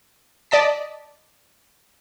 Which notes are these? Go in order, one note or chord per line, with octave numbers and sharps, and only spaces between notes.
D5 D#5 A5 B6